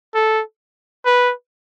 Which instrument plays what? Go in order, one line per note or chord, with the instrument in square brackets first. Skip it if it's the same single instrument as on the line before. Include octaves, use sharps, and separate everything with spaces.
[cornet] A4
B4